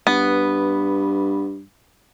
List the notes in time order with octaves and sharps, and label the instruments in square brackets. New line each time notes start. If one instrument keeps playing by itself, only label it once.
[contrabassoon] G2 [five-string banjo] B3